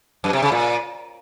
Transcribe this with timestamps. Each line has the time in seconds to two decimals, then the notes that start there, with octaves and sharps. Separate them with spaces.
0.24 F#2
0.33 C3
0.42 C#3
0.52 A#2